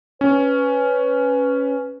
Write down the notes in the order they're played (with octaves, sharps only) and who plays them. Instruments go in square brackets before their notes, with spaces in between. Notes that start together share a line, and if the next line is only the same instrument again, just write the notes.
[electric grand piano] C#4 [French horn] B4